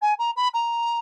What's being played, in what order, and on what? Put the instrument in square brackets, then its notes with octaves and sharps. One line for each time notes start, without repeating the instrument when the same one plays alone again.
[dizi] G#5
A#5
B5
A#5